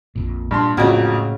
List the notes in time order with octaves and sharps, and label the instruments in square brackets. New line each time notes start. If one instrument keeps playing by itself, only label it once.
[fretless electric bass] A#1 F2 A#2
[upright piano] G2 A5 C6 [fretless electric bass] A#2
[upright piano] A#1 F2 F#3 [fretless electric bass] A2 [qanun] C#3 C#4 F#4